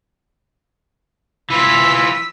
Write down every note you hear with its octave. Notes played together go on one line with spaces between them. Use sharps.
E3 F4 E6 B6